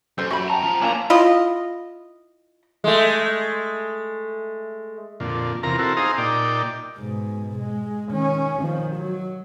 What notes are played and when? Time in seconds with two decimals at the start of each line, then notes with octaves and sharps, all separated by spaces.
0.18 F#2 A4 C5 G6
0.31 F#4 E5 B5
0.50 G5 A5 A#5
0.63 F3
0.82 A#3 C#4 D4 E4 C#5 F5 G#5 A#5
1.10 E4 F4 D#5
2.84 G#3 A3
5.20 F2 A#2 D3
5.63 E2 C3 F4 A#4 A#5
5.79 C4 E4 F#4 A4 A#4
5.97 D#4 G#4 C5 F5 A#5 D#6
6.18 A#2 D#4 D5 G5
6.97 G#2 B2
7.59 G#3
8.12 D#3 C#4
8.62 D#3 F3
8.97 F#3